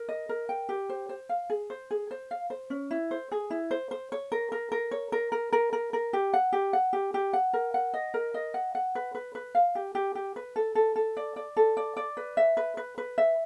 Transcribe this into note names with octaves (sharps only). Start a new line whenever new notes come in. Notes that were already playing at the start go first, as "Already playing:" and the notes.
Already playing: A#4
D#5
A#4
G5
G4
C5
C5
F5
G#4
C5
G#4
C5
F5
C5
C#4
E4
C5
G#4
E4
C5
C5
C#5
A#4
A#4
A#4
C#5
A#4
A#4
A#4
A#4
A#4
G4
F#5
G4
F#5
G4
G4
F#5
A#4
F#5
D#5
A#4
D#5
F#5
F#5
B4
B4
B4
F5
G4
G4
G4
B4
A4
A4
A4
D5
D5
A4
D5
D5
B4
E5
B4
B4
B4
E5